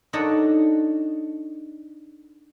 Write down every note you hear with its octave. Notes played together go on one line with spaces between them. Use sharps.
D4 D#4 A4 C#5 D#5 F#5